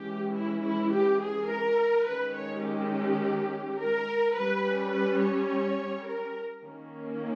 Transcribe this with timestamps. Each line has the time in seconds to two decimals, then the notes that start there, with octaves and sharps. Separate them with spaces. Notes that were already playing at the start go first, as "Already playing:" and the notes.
Already playing: E3 G#3 C#4 G4
0.36 E4
0.63 E4
0.93 G4
1.22 G#4
1.50 A#4
2.07 D#3 G#3 C#4 B4
2.36 C#5
2.64 G4
3.79 A#4
4.35 G3 C#4 B4
4.93 B4
5.21 C#5
6.07 A#4
6.65 D#3 A#3 C#4